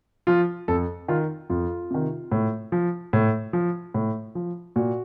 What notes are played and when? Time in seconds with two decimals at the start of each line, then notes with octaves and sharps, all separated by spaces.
0.27 F3 F4
0.68 F2 A4
1.08 D#3 F4
1.50 F2 F4
1.91 C3 D#3
2.32 A2
2.72 F3
3.13 A2
3.53 F3
3.94 A2
4.35 F3
4.76 A#2 F#4